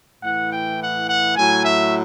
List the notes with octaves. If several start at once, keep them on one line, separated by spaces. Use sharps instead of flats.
A2 E3 F#5
G5
F#5
F#5
A2 F#3 G#5
E5